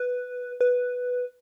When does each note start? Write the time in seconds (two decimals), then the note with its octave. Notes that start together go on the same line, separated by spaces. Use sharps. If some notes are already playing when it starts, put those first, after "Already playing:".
Already playing: B4
0.61 B4